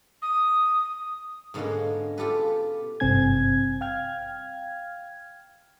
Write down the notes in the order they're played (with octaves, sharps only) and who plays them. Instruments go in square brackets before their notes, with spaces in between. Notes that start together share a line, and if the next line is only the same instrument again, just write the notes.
[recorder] D#6
[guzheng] G#2 B2 D3 G#3 A#3 C#4
F4 G4 A4 B4
[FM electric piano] G#1 G2 C3 C4 G#5 G#6
F5 G5 F6 G#6